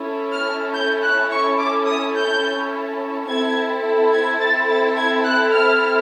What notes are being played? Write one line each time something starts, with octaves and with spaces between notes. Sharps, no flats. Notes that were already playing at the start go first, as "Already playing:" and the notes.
Already playing: C#4 E4 A4
F6
G6
F#6
C#6
D6
D#6
G6
C4 E4 A4 G#6
G#6
A6
A6
G#6
F#6
F6